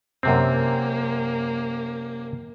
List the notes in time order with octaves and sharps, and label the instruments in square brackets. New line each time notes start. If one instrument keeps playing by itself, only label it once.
[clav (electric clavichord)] F#2 C3 C4 [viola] A#3